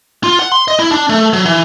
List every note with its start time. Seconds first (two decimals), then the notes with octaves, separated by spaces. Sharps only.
0.24 F4
0.39 F#5
0.52 C6
0.68 D#5
0.79 E4
0.91 D4
1.09 A3
1.33 F#3
1.45 E3